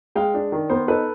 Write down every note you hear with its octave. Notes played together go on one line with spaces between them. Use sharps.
G#3 F5 G5
D4
D#3
B3 A#4 C5
D#4 A4 B4